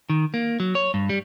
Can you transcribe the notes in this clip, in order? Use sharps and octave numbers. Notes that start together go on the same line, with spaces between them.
D#3
A#3
F#3
C#5
G2
G3